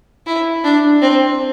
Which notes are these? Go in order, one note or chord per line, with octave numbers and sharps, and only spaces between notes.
E4
D4
C4